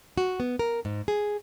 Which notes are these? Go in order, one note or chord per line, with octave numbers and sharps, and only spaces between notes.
F#4
B3
A#4
G#2
G#4